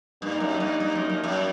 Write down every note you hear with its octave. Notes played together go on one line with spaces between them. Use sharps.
G2 G3 A#3 D#4
F#2
G2
G2
F#2
F#2
F#2